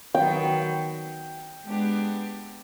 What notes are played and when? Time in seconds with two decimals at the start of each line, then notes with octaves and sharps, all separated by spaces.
0.15 D#3 F#3 B3 G5
1.65 G#3 B3 D4 G4